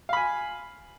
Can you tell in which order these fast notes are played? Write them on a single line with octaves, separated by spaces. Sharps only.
F5 B5 G#5